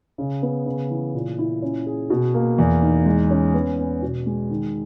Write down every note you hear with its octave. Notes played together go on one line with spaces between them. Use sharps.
C#3
B3
C#3
E3
A#2
E4
C#4
G#4
B2
A#3
E2
D#4
G#3
C#4
B3
B3
B2
G#3
D#3